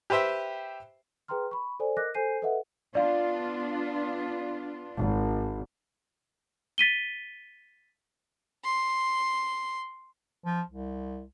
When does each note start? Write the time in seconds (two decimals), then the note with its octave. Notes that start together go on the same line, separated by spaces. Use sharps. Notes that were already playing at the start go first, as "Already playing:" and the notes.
0.10 G4 B4 C5 E5 G5
1.28 G#4 B4 G5 A#5 C6 F6
1.51 B5 C#6
1.80 A4 C5 D5 G#5
1.97 A#4 D#5 D6 F#6 A#6
2.14 A4 C5 G#5 G6 C7 D#7
2.42 A4 B4 D#5 E5 F#5
2.95 B3 D4 F4 D5 F5
4.97 G#1
6.78 A6 B6 D#7 G7
8.65 C6
10.45 F3
10.69 C2